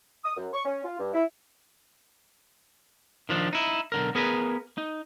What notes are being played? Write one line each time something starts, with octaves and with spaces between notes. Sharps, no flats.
D#6
F#2
C#6
C#4
F4
G2
E4
D#3 F3 D4
D#4 E4
B1 D3 A#4
B3 G#4 A#4 B4
D#4